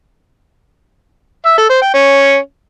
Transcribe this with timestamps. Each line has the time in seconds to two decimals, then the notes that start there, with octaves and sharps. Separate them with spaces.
1.46 E5
1.58 A4
1.70 C5
1.82 G5
1.93 C#4